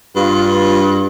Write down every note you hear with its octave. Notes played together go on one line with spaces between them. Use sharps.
G2 F4